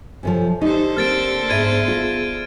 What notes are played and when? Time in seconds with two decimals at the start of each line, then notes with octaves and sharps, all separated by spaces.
0.23 C3 D#3 F3 A4 C#5 G#5
0.61 D3 D#4 G4 A4 C5
0.97 A#3 C4 F6 A6 D7
1.50 G#2 B3 G#4 D5 E5 G#6 D#7
1.88 F4